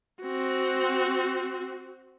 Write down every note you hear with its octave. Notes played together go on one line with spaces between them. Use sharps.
C4 F#4